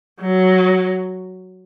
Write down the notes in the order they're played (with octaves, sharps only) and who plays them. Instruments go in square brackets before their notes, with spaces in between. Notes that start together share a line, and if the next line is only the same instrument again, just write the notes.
[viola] F#3